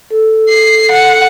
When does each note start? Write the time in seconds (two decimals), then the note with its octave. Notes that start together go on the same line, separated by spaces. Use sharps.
0.11 A4
0.49 C7
0.92 F#5